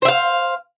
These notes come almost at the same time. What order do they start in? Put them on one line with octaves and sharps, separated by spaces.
C5 E5 F5